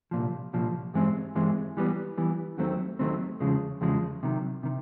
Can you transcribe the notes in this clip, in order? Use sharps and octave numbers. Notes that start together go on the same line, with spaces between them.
C2 A#2 F3
C2 A#2 F3
G2 E3 G#3 C4
G2 E3 G#3 C4
E3 G3 B3
E3 G3 B3
D#2 D#3 F#3 A3 C4
D#2 D#3 F#3 A3 C4
E2 C#3 F3 G#3
E2 C#3 F3 G#3
C3 D#3 F#3
C3 D#3